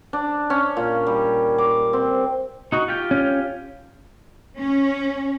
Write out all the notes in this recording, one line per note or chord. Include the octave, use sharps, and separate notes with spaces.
D4
C#4
A#2
G3
D6
C4
D#4 F#4
F4 G4 G5
C#4
C#4